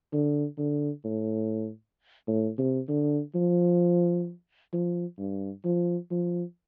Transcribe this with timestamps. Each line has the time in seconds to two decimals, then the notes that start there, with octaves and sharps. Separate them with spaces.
0.13 D3
0.58 D3
1.05 A2
2.28 A2
2.59 C3
2.89 D3
3.35 F3
4.73 F3
5.18 G2
5.65 F3
6.11 F3